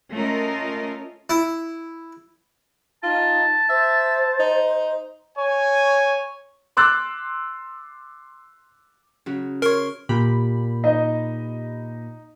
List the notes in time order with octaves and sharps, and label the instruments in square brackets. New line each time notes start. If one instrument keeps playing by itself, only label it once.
[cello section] A3 C#4 F4 A#4 D#5
[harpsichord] E4
[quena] D#4 [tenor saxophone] F4 [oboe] A5
[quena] C5 [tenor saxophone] E5
[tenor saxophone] D#4
[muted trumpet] C#5 [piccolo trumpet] G#5
[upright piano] C6 D6 E6 F#6 A6
[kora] C#3 F#3
[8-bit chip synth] A#4 [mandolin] C#5 C6
[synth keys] A#2 G4 B5
[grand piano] D#4 D#5